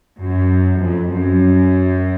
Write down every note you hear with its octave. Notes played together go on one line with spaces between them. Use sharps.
F#2
F2
F#2